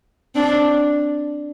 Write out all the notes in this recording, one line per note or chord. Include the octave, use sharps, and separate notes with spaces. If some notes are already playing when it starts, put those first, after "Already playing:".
C4 D4